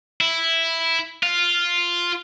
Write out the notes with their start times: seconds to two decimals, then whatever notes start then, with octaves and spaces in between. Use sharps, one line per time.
0.21 E4
1.23 F4